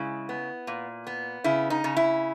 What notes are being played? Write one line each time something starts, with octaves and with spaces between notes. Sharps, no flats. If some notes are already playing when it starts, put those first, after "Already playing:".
Already playing: C#3 G#3 E4
B3
A#2
B3
C#3 E4
D#4
C#3
E4